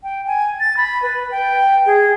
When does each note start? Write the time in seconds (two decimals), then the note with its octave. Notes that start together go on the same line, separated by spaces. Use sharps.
0.03 G5
0.27 G#5
0.60 A6
0.77 B5
1.02 B4
1.31 G5
1.86 G#4